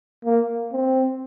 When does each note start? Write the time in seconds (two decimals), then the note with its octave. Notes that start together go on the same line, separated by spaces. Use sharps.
0.25 A#3
0.73 C4